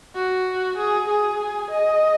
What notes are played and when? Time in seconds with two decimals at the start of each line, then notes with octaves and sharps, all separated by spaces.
0.15 F#4
0.77 G#4
1.09 G#4
1.71 D#5